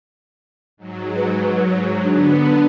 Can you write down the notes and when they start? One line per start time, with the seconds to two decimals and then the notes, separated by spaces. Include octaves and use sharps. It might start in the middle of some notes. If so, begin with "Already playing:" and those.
0.77 G#2 F#3
1.15 B4
1.70 C#5
2.03 D3 B3 D4